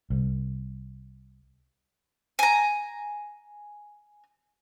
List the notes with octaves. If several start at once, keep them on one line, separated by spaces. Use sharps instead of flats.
C2
G#5 A#5